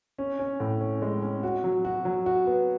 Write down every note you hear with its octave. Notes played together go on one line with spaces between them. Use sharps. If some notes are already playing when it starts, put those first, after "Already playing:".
C#4
C#4
A2
C#4
G#3
C#4
F#4
F#3
F#4
F#3
F#4
B3